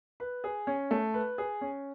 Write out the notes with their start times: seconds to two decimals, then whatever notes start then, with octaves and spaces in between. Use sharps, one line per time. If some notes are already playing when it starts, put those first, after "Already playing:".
0.20 B4
0.44 G#4
0.67 C#4
0.91 A3
1.14 B4
1.38 G#4
1.61 C#4